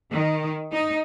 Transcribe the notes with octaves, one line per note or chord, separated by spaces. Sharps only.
D#3
D#4